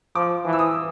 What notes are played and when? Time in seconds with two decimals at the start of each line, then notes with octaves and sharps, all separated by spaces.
0.15 F3 D6
0.44 E3
0.53 E6
0.59 D#6